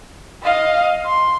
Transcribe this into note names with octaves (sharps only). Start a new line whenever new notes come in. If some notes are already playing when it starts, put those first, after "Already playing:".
D#5 F5
C6